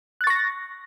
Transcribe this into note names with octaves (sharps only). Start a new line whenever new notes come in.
C#6 F#6 A6 A#6